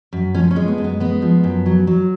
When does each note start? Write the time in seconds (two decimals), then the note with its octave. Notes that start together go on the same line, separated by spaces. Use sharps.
0.13 F#2
0.35 F3 C#4
0.51 C#4
0.56 G#3
0.68 B3
0.78 F#2
0.84 B3
1.00 G#3 B3
1.22 F3
1.44 F#2
1.66 F#3
1.87 F#3